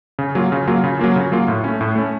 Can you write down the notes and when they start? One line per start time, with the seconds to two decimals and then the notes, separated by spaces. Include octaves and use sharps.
0.19 C#3
0.35 F#3 A#3 F4
0.52 C#3
0.67 F#3 A#3 F4
0.84 C#3
0.99 F#3 A#3 F4
1.16 C#3
1.32 F#3 A#3 F4
1.48 A2
1.64 A3 C#4
1.81 A2
1.96 A3 C#4